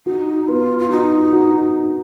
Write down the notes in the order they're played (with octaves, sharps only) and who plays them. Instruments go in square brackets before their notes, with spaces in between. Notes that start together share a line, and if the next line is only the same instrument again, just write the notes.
[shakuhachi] D#4 [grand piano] F#4
[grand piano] B3 [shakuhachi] F4
[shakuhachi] F4
[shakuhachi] D#4 [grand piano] F#4
[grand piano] F#4